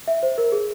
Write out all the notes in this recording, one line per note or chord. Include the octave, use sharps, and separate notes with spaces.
E5
C5
A#4
G#4